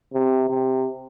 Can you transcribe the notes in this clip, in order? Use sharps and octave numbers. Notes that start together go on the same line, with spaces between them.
C3
C3